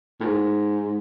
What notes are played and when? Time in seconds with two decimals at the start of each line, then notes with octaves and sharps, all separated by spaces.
0.20 A2
0.24 G#2